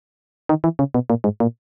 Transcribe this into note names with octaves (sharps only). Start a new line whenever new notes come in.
D#3
E3
C#3
B2
A#2
G#2
A#2